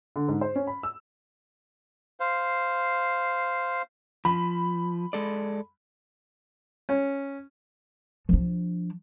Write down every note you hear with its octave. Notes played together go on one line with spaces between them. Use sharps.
D3
G#2
C5
C#4
B5
E6
C5 F5
F3 B5
G#3 A4 D5
C#4
F3 D4